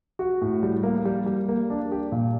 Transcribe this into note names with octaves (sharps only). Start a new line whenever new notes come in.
F#4
A2
G3
A#3
G3
G3
A#3
D4
G4
A#2